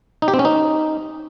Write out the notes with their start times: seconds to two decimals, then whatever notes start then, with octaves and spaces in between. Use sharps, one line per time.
0.22 D#4
0.28 G4
0.34 C4
0.39 C#4
0.45 D#4